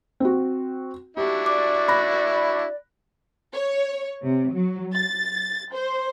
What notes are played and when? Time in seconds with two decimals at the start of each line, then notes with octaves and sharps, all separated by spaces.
0.20 C4 F#4
1.17 D4 E4 F#4 G4
1.46 D5 D6
1.88 B5 F#6 A#6
3.53 C#5
4.23 C3
4.52 F#3
4.94 A6
5.72 C5